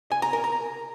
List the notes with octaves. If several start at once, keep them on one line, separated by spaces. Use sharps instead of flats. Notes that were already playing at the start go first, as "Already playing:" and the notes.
G#5
A#5
A#4
A#5